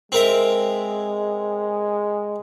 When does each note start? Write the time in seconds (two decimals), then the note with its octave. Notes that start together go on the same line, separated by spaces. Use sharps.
0.12 G#3 C4 A#4 E5